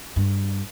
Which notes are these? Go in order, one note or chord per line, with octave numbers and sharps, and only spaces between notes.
G2